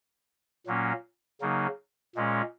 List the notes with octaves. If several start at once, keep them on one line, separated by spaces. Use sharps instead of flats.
A#2 F#3 A#3 C#4
C#3 F#3 A#3 D#4
A#2 G#3 C#4